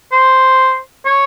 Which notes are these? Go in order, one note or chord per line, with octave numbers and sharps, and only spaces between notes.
C5
C#5